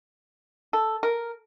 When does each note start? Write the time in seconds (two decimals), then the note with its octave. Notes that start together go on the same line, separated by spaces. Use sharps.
0.73 A4
1.03 A#4